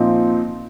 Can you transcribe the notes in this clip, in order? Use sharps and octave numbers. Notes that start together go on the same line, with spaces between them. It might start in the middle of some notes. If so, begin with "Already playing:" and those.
Already playing: A#2 F3 C4 D#4